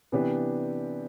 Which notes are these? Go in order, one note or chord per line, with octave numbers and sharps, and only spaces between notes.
C3 E3 B3 D4 G4